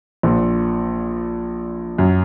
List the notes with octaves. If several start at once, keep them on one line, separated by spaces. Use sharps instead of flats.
A#1 A#2
F#2